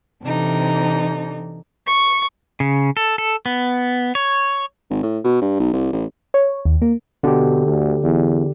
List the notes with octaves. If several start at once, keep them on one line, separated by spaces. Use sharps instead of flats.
C3 E3 D4 D#4 A4
C#6
C#3
A4
A4
B3
C#5
G#1
A2
B2
G2
B1
C2
A1
C#5
D#2
A#3
B2 D3 D4 G4
D2
E2